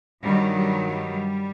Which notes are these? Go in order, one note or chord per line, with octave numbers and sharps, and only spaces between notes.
G2 D#3 F#3 G3
G3
G3